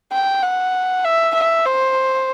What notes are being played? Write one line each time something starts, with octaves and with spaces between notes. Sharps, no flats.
G5
F#5
E5
E5
C5